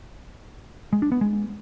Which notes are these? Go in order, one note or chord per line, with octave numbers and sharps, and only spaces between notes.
G#3
D4
B3
G#3